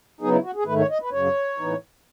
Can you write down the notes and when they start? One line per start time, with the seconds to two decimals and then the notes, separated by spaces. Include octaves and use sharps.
0.21 C#3 F#3 B3 D#4 G#4
0.32 E4
0.43 F#4
0.56 G#4
0.66 G#2 D#3 A3 B4
0.78 C#5
0.90 D#5
1.02 B4
1.12 F#2 C#3 F#3 C#5
1.58 A2 E3 B3 D#4